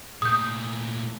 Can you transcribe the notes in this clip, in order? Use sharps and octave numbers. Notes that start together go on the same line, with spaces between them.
A#2 A3 D#6 G6